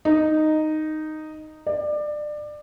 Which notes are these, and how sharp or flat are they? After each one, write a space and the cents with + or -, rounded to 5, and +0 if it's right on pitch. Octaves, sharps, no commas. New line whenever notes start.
D#4 -5
D5 +25